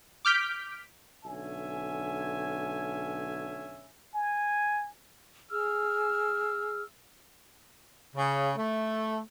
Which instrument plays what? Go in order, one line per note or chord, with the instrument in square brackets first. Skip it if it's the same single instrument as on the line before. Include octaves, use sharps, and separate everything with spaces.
[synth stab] D6 F6 G6 B6 D7
[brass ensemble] B1 D3 C#4 E5 G#5
[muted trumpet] G#5
[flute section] G#4 E6 F6
[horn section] C#3
A3